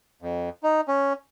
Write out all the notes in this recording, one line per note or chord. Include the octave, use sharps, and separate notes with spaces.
F2
D#4
C#4